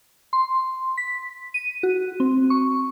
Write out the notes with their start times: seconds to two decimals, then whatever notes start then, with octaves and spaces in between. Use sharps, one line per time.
0.33 C6
0.98 B6
1.54 D#7
1.83 F#4
2.20 C4
2.50 C#6